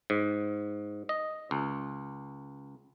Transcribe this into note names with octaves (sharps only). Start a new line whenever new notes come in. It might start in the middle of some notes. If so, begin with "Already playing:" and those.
G#2
D#5
C#2